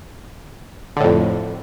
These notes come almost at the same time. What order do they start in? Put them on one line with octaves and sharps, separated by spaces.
D3 A2 F2